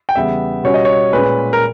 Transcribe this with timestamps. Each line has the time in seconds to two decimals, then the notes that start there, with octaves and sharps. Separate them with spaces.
0.09 G5
0.15 E2 C#3 G3 B3 E5
0.64 B2 G3 C#4 C#5
0.74 D#5
0.85 C#5
1.13 A#2 G#3 C#4 B4
1.53 A#4